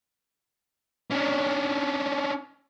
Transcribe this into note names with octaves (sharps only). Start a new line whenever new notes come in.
C#4 D4